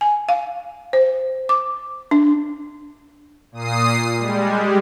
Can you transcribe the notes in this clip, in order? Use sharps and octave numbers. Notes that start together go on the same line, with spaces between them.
G#5
F5
C5
D6
D4
A#2 D#6 C7
G3 G#3